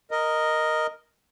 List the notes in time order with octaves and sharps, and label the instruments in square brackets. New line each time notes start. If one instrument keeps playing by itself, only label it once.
[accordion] A#4 D#5